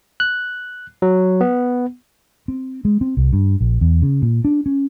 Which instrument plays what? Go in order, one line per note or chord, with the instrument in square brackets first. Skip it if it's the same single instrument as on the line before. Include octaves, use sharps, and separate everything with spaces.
[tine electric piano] F#6
F#3
B3
[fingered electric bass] C4
G#3
C4
C2
G2
A#1
E2
C#3
A#2
D4
C#4